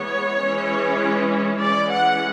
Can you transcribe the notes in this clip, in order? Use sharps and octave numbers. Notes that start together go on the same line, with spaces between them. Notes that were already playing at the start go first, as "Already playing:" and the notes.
Already playing: E3 G#3 B3 C#5
E3 G#3 C#4
E3 G#3 C#4 D5
F#5